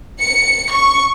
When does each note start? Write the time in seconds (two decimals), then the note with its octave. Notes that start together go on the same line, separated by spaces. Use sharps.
0.20 C#7
0.71 C#6